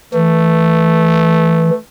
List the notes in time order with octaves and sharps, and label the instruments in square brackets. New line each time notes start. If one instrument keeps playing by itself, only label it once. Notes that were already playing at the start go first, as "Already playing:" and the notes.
[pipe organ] E3 [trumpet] A3